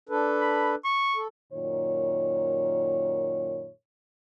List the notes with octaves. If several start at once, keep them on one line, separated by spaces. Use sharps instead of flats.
D4 A4 B4
B5
C#6
A4
F#2 A#2 D#3 C#5